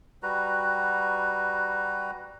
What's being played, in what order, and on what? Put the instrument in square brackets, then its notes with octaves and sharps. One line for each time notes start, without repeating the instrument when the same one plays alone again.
[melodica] G3 F#4 B4 A#5